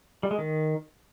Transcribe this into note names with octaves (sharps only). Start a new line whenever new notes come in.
G3
G#3
D#3